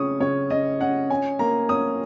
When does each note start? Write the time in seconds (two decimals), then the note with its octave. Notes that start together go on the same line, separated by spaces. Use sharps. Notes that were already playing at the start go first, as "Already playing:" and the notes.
Already playing: C#3 C#4 C#6 D#6
0.20 C#3 C#5
0.50 C#4 D#5
0.81 C#4 F#5
1.10 C#4 G#5
1.39 A#3 A#5
1.69 C#4 D#6